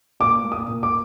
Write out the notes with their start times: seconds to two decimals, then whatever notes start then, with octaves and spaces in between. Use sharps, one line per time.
0.20 A#2 D6
0.43 A#3
0.52 D#6
0.68 A#2
0.83 D6